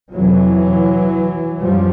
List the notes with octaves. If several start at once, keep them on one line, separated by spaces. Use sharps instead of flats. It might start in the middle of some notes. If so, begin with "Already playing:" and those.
F2 C3 E3 F#3
F#2 F3 G3